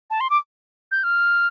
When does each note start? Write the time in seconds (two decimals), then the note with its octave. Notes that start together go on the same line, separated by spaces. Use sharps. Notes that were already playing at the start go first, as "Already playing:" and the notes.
0.10 A5
0.20 C6
0.30 D6
0.92 G6
1.04 F6